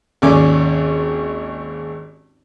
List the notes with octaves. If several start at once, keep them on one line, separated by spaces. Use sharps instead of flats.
G#1 D#2 C#4 D5 G#5 D6